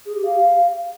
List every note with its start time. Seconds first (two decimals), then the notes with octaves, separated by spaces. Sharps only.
0.05 G#4
0.15 G4
0.25 F5